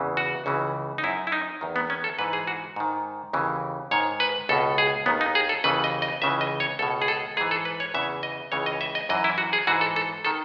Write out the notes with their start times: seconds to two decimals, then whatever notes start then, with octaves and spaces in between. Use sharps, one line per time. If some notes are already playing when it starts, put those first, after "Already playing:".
Already playing: E2 C#3 E3
0.17 F#4
0.46 C#2 C#3 E3
0.98 D#4
1.03 F#2 D#3 E4
1.27 E4
1.32 D#4
1.61 E2 D#3
1.76 B3
1.90 C#4
2.04 A4
2.19 G#2 E3 B4
2.33 G#4
2.47 F#4
2.76 G#2 D#3
3.33 D#2 C#3 E3
3.91 G#2 D#3 C#5
4.20 B4
4.49 C#2 B2 A4
4.78 G#4
5.06 D#2 D#3 B3
5.21 D#4
5.35 G#4
5.49 A4
5.64 D#2 C#3 E3 B4
5.84 D#5
6.02 D#5
6.22 C#2 C#3 E3 E5
6.41 D#5
6.60 C#5
6.79 C#2 B2 A4
7.02 G#4
7.08 A4
7.37 G#2 G#4
7.41 E3
7.51 A4
7.65 B4
7.80 C#5
7.94 E2 C#3 E3 E5
8.23 D#5
8.52 C#2 C#3 E3 C#5
8.66 D#5
8.81 E5
8.95 D#5
9.09 F#2 E3 D#5
9.24 E4
9.38 F#4
9.53 G#4
9.67 G#2 E3 F#4
9.81 A4
9.96 A4
10.25 D#3 A4